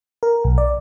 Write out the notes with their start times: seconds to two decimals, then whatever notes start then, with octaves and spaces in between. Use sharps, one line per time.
0.23 A#4
0.44 B1
0.58 D5